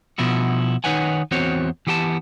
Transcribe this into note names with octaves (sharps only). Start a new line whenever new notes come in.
B2 F3 E4 F#4
D#3 D#4 B4 C#5 F#5 G#5
E2 C4 F#4 C5 C#5
E3 B3 G4 G5 A5